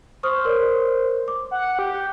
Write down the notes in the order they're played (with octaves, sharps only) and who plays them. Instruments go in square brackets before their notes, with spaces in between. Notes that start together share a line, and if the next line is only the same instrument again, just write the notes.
[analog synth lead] C5 [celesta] C#6 D#6 F6
[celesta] A#4 C#5 D5
D6
[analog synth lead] F#5
G4